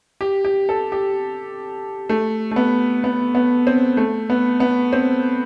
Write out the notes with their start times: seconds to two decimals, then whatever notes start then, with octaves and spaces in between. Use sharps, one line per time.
0.21 G4
0.45 G4
0.69 A4
0.92 G4
2.09 A3
2.51 A3
2.56 B3
3.04 B3
3.35 B3
3.67 C4
3.97 A3
4.30 B3
4.60 B3
4.93 C4